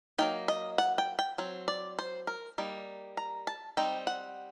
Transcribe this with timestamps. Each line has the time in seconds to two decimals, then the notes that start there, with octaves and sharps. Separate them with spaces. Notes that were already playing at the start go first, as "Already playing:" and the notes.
0.18 F#3 A#3 D#4 G5
0.48 D#5
0.78 F#5
0.98 G5
1.19 G5
1.38 F#3 C4
1.68 D5
1.99 C5
2.27 A#4
2.58 G3 A#3 D#4
3.17 A#5
3.47 A5
3.77 G3 C4 D#4 G5
4.07 F#5